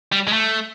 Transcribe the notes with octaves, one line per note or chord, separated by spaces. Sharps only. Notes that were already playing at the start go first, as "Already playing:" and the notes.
G3
G#3
A3